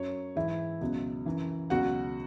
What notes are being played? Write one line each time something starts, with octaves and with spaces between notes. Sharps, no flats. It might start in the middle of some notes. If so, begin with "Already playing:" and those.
Already playing: F#2 F#3 C#5
G#2 E3 E4 E5
C#2 B2 F#3
F#2 E3
C#2 B2 F#3 F#4 F#5